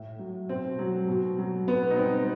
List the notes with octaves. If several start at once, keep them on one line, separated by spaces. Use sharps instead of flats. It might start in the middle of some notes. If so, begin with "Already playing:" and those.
Already playing: A2
F#3
B2 C4
F#3
B2
F#3
B2 B3
D#4
G3 C4
B3